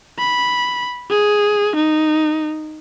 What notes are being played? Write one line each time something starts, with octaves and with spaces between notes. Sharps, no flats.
B5
G#4
D#4